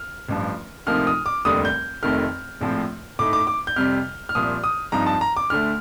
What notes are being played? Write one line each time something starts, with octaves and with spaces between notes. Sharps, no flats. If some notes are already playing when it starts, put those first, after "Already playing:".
Already playing: F6
A1 G2 F3
D2 C3 F3 A#3 D#4 F6
D#6
D6
F1 D#2 D3 G3 D#6
G6
F1 F2 D#3 A3 F6
A#1 A2 F3 C4
A2 A3 D#4 D6
D6
D6
G6
F2 C3 G3 F6
F6
C2 A#2 F3 D#6
D#6
G2 F3 C4 D#4 A#5
A5
A#5
D6
D2 D3 A3 F6